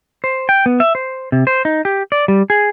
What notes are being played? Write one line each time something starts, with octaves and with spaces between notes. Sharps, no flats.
C5
G5
B3
E5
C5
C3
C5
D#4
G4
D5
G3
G#4